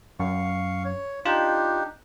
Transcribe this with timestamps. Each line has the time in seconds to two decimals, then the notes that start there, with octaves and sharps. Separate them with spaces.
0.20 F#2 F5 C#6
0.85 C#5
1.26 D4 D#4 F4 G4